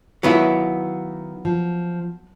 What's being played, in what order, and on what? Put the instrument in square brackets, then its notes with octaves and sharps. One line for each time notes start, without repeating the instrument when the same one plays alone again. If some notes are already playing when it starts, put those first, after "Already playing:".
[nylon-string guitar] D#3 F4 [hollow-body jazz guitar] F#3 B3 E4
[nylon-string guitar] F3